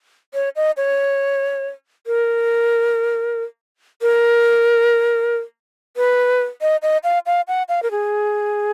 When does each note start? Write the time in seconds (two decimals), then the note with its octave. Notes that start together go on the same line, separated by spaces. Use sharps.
0.34 C#5
0.56 D#5
0.77 C#5
2.07 A#4
4.02 A#4
5.97 B4
6.62 D#5
6.82 D#5
7.04 F5
7.26 F5
7.48 F#5
7.69 F5
7.83 A#4
7.91 G#4